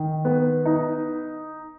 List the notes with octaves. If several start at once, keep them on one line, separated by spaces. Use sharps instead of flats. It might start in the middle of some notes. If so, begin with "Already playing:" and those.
Already playing: D#3
B3
D#4